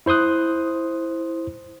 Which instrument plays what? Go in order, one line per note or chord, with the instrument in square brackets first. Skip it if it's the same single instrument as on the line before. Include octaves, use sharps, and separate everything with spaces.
[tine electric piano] E4 C5 C6 D#6 F#6